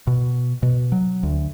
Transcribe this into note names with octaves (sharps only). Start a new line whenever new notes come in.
B2
B2
F#3
D2